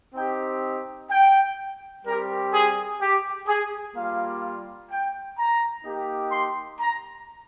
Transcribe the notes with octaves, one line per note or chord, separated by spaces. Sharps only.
C4 D#4 G4 G5
G5
G3 C4 G4 A#4
G#4
G4
G#4
G3 A#3 F4 F5
G5
A#5
A#3 D#4 G4
C6
A#5